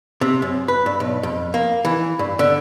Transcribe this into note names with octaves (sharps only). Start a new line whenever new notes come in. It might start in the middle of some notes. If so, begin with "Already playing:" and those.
C3
F#2
B4
G2
B1
F2
A#3
E3
G2
D3